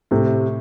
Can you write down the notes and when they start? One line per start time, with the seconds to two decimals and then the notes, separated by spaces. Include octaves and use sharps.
0.11 A2 C3